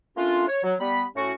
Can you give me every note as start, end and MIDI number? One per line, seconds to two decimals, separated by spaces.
0.17 0.46 57
0.17 0.46 58
0.17 0.46 61
0.17 0.46 62
0.17 0.46 65
0.48 0.63 73
0.64 0.74 54
0.80 1.04 55
0.80 1.04 59
0.80 1.04 83
1.16 1.32 45
1.16 1.32 61
1.16 1.32 66
1.16 1.32 85